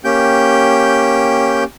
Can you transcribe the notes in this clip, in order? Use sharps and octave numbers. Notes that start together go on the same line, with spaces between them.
A#3 C#4 G4 G5 G6